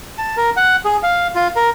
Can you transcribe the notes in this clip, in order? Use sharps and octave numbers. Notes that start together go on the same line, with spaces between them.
A5
A#4
F#5
G#4
F5
F4
A#4